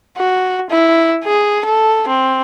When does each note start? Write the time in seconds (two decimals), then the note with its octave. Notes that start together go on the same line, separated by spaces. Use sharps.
0.17 F#4
0.70 E4
1.25 G#4
1.65 A4
2.08 C4